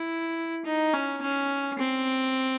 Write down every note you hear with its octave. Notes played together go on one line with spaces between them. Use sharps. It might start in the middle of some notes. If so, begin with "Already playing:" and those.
Already playing: E4
D#4
C#4
C#4
C4